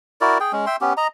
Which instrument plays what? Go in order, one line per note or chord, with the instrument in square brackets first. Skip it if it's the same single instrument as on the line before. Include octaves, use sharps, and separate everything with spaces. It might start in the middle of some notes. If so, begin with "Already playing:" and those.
[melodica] E4 F#4 A#4 D5
G#4 G5
G#3 C#4
E5 G5 C6
B3 C#4 G4
D#5 A#5